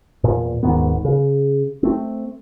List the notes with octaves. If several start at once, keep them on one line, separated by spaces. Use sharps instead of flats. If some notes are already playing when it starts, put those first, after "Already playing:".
E2 A#2
D#1 G#2 D#3 B3
C#3
A3 C4